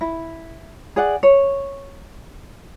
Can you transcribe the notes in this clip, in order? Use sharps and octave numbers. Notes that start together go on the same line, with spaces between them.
E4
G#4 D5 F#5
C#5